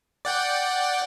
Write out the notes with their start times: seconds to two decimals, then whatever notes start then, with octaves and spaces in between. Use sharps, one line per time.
0.25 D5 F#5 G5